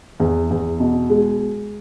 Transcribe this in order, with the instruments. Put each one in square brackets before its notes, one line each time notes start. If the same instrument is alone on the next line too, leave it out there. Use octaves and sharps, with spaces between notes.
[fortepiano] E2
E2
B2
G#3